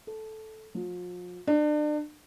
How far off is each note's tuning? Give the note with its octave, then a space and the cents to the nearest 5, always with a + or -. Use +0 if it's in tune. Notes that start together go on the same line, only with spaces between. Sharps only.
A4 -10
F3 +40
D4 +35